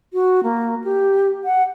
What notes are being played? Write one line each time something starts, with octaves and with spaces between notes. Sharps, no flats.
F#4
A#3
G4
F#5